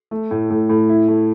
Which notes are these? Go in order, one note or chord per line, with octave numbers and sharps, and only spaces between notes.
A3
A2
A2
A2
E4
A3